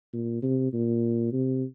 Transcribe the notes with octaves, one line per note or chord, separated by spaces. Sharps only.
A#2
C3
A#2
C3